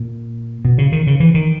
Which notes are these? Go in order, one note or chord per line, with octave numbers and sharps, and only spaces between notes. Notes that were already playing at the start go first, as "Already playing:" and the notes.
Already playing: A#2
B2
C#3
D#3
C#3
E3
D#3